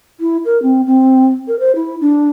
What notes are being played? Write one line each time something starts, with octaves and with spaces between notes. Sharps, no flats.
E4
A#4
C4
C4
A#4
C5
E4
D4